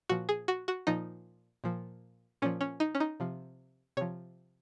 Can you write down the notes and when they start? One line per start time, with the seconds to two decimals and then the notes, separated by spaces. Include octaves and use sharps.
0.09 A#2 F3 F#4
0.29 G#4
0.48 F#4
0.68 F#4
0.87 A#2 F3 D#4
1.64 A#2 F3
2.42 A#2 F3 C#4
2.61 C#4
2.80 D#4
2.95 C#4
3.00 D#4
3.20 C3 F3
3.97 C3 F3 C#5